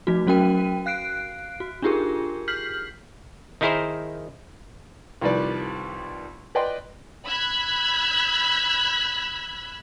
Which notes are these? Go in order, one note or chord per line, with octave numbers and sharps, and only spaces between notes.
F3 A3 D#4 F#4
F#3 C#4 F#4 A#4 G5 D#7
F5 F#6 C7 D7
F#4
D4 D#4 F4 G4 G#4 A#4
F6 G6 B6 C7 F#7
D#3 D#4 E4 G#4 A#4 C5
C2 D#3 F3 G3 B4 D5
B4 D5 D#5 G5 C6
B5 E6 F#6 G#6 B6